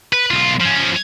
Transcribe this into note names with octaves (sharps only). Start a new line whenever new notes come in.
B4
B1 F4
F3 C#4